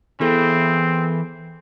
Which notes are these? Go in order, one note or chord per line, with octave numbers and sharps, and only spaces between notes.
E3 B3 C4 G#4 A4